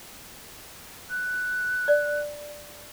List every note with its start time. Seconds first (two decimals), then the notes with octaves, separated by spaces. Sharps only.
1.10 F#6
1.88 D5